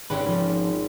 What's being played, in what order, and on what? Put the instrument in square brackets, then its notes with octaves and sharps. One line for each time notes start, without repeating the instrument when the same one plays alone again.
[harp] G#1 [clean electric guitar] C#4 G4 B4
[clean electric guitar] F3 C#4